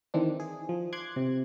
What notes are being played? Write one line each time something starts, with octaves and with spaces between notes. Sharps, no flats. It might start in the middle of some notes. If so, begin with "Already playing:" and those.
D#3 E3 C4 D4
G#4
F3
C6 D6 F#6 G#6
C3